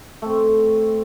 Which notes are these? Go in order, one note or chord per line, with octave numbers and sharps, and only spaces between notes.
A3 C4